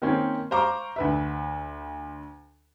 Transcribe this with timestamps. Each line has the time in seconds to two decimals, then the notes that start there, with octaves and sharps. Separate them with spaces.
0.02 D#3 A#3 C4 C#4
0.51 C5 F5 A#5 C#6 D6
0.96 D2 B4 E5